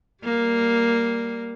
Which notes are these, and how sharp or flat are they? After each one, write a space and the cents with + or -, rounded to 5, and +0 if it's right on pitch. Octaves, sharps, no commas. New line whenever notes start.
G3 +0 A#3 +0